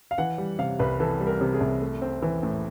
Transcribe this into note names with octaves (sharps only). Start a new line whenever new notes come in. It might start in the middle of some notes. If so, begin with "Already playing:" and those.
F5
E3 F#5
G3
C3 F5
C2 B4
E3 A4
G3
A#4
C3
G#4
C2
A3
C4
E3
A2